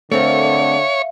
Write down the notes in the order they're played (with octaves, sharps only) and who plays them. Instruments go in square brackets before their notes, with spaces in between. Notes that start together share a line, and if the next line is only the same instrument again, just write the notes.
[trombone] D3 [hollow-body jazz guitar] A3 C4 A#4 [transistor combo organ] C#5 [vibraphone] E5 F5